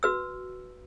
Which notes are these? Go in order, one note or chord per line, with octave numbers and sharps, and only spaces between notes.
F#4 B4 E6